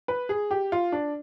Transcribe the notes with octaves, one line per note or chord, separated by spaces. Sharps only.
B4
G#4
G4
F4
D4